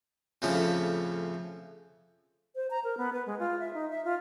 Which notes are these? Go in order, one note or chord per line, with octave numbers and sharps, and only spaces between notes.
F2 A2 C#3 F3 C#4 E4
C5
A#5
A#4
B3
B4
G#3
F4
E5
D#4
E5
F4